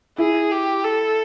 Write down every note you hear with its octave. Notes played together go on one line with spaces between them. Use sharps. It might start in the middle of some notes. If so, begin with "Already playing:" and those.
E4 G#4
G4
A4